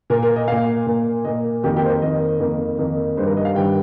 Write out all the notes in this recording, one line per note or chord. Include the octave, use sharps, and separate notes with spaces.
A#2 A#3 A#4
A#4
D#5
A#2 A#3 F5
A#2 A#3
A#2 A#3 D#5
F2 D#3 A#3 G4
G4
C5
A#4
F2 D#3 A#3 D#5
F2 D#3 A#3
F2 D#3 A#3
G2 D#3 G3 C5
A#4
D#5
F5
G2 D#3 G3 G5